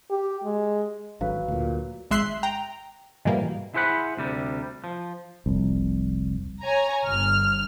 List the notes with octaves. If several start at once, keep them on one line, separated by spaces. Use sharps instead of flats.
G4
G#3
G#1 F#3 B4 F5
D2 A#2
G#1 G#3 E5 C6 F#6 C7
G5 A#5
G#2 B2 E3 G3 A#3
E4 G#4 C5 F#5 B5
D2 C3 G3
F3
F1 C2
C#5 G#5 A#5
G1 F6